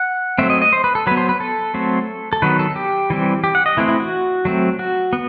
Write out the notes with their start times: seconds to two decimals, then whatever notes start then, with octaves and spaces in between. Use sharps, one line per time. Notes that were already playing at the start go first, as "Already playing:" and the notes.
Already playing: F#5
0.38 F#3 A3 C4 E5
0.50 D#5
0.61 D#5
0.73 C5
0.84 B4
0.95 A4
1.07 F#3 B3 B4
1.17 C5
1.29 B4
1.40 A4
1.74 F#3 A3 C4
2.33 A4
2.42 D#3 F#3 B3 B4
2.59 A4
2.76 G4
3.10 E3 G3 C4
3.44 G4
3.55 F#5
3.66 D#5
3.77 E3 A3 C4 E4
3.88 E4
4.00 F#4
4.45 F#3 A3 C4
4.79 F#4
5.13 B3